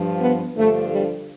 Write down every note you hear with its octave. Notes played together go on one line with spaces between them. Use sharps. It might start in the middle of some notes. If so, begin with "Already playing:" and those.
Already playing: G2 F3
B3
G2 D3 F3 A3
G3